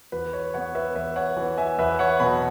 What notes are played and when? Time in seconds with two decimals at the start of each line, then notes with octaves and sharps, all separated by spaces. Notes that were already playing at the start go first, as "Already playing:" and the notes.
0.12 E2 B4
0.33 C#5
0.54 E3 B3 C#5 F#5
0.75 B4 E5
0.96 E2 B4 E5
1.16 C#5 F#5
1.37 E3 B3
1.57 E5 G#5
1.79 E2 B4 E5
1.99 C#5 F#5
2.20 B2 F#3 B3 F#5 B5